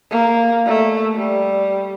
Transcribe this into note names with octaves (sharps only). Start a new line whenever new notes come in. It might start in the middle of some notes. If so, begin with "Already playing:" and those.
A#3
A3
G3